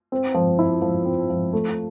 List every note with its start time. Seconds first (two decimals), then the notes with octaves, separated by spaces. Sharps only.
0.12 C4
0.34 F3
0.59 E4
0.82 F3
1.06 C4
1.30 F3
1.53 A3